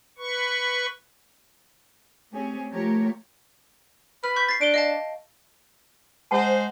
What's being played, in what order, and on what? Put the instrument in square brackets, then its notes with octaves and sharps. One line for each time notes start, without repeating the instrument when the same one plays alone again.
[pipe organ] B4 C#6
[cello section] A3 C4 C#4 G4 G#4
F3 A3 F4 G4 A#4 C#5
[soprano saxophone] B4 [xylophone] F6
[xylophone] C#6 G6 B6
A6 C7
[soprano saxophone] D4 [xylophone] D7 G7
[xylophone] D#5 F5 A5
[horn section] G#3 C5 [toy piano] F#5 A5